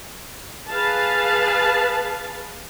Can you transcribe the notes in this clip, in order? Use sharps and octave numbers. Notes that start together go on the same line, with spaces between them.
G#4 B4 F5 A5